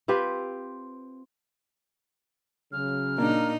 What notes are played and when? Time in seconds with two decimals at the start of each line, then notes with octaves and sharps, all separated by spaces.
0.08 C4 F4 G4 B4
2.72 C#3 F#3 F6
3.18 A#2 A#3 D4 D#4